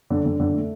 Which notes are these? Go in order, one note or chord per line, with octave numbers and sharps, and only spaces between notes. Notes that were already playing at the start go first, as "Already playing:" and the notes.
D3
D3
D3
A3